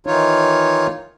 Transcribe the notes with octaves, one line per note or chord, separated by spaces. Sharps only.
D#3 E3 D#4 F4 C#5